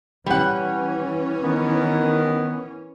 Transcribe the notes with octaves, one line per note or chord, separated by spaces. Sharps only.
E3 G3 C#4 F#5
D#3 B3